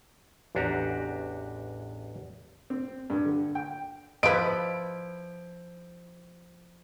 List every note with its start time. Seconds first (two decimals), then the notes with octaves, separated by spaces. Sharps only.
0.55 A1 E2 D4 F#4 G4 A#5
2.70 C4
3.10 G2
3.25 D3
3.55 G5
4.23 F3 E4 B4 D#5 D7